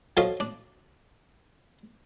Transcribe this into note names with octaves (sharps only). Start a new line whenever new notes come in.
F3 F#3 F4 A4 D#5 F5
D4